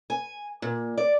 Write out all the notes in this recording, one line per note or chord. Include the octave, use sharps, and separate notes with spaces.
G#5
A#2
D5